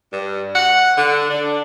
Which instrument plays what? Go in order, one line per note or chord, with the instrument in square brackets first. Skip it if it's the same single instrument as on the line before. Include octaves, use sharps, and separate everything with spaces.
[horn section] G2
F#5
D3
D4